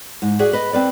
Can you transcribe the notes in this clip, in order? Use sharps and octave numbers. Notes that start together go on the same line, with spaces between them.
G#2
F#4 G#4 D5 E5 F#5
B4 D#5
C4 B4 D5